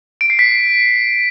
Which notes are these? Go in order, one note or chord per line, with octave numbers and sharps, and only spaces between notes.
D7
C7
B6